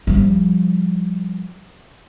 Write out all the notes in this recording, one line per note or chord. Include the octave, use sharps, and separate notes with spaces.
F3 G3